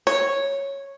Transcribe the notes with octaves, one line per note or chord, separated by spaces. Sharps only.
C#5